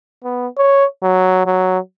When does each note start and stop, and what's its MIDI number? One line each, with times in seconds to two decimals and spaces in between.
0.24 0.47 59
0.58 0.85 73
1.03 1.44 54
1.46 1.78 54